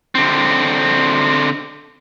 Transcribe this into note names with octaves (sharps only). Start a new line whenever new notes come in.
D3 C4